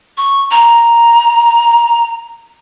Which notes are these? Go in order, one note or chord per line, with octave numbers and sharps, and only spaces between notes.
C#6
A#5